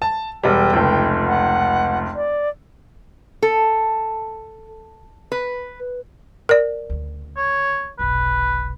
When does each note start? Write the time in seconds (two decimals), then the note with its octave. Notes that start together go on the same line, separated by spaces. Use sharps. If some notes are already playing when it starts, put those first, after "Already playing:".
0.02 A5
0.43 E1 G3 G5
0.73 F1 C#2
1.27 F#5
2.15 D5
3.42 A4
5.32 B4
6.49 A#4 D5
6.90 D2 C#3
7.37 C#5
7.99 F1 B1 B4